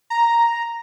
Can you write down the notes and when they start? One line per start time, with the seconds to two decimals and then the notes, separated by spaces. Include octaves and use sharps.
0.10 A#5